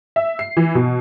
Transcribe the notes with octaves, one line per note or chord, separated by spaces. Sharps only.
E5
C7
E3
B2